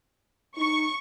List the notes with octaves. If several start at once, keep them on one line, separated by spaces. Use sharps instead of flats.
D#4 C#6